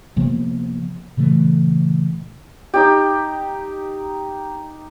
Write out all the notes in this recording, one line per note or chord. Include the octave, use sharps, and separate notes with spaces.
C3 F3 A#3 B3
A#2 C#3 E3 A3
D#4 G4